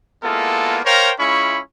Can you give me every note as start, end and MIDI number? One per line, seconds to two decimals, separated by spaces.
0.23 0.80 56
0.23 0.80 58
0.23 0.80 59
0.23 0.80 64
0.23 0.80 65
0.23 0.80 69
0.85 1.11 70
0.85 1.11 72
0.85 1.11 73
0.85 1.11 77
0.85 1.11 79
0.85 1.11 82
1.19 1.59 56
1.19 1.59 61
1.19 1.59 64
1.19 1.59 65
1.19 1.59 83
1.19 1.59 85